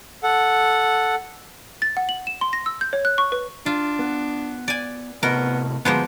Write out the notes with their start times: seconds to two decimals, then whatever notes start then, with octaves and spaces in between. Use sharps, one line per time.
0.23 A4 F#5
1.82 A6
1.97 F#5
2.09 F#7
2.27 E7
2.41 C6
2.53 A#6
2.66 E6
2.81 G6
2.93 C#5
3.05 F#6
3.18 C#6
3.32 B4
3.66 D4 F4
3.99 B3
4.68 D5 G#5
5.23 A2 C3 B3 A#4 D#5
5.85 D2 F3 G#3 A#3 B3